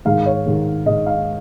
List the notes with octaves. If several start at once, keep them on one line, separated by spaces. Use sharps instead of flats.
G#2 D#3 G#3 F5
C#5
G#2 D#3 G#3
G#2 D#3 G#3 D#5
F5